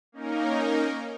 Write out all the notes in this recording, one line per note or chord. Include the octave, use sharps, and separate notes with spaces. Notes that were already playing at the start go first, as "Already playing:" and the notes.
A#3 C#4 D#4 A#4